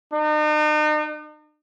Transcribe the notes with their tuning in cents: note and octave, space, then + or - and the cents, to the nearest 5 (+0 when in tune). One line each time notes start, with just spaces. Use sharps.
D#4 -40